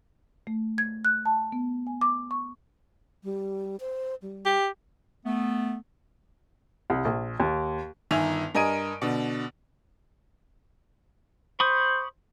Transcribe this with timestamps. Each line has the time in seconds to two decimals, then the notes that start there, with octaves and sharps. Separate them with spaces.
0.47 A3
0.78 G#6
1.05 F#6
1.26 A5
1.52 B3
1.87 G#5
2.01 D6
2.31 C#6
3.23 G3
3.80 C5
4.22 G3
4.46 G4
5.26 A3 B3
6.90 C2
7.05 A#1
7.40 D#2
8.11 G1 D#3 E5 G#5 F7
8.55 G2 A#4 D#5 G#5 D7 D#7
9.02 B2 D3
11.60 C5 B5 C#6 D#6